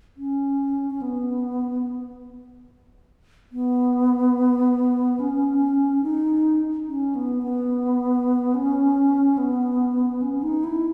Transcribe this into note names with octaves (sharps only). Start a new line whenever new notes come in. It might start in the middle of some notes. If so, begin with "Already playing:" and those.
C#4
C#4
B3
B3
C#4
D#4
C#4
B3
B3
C#4
B3
C#4
D#4
E4